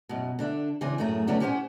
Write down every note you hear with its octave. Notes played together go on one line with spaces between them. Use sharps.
F#2 B2
D3 D4 E5
C#3 E3 C4 D4 D5 G#5
F#2 A2 F#3 A3 G#4
D3 F#3 A3 B3 C#4 D4
C#4 G4 C5 D#5 F#5 G#5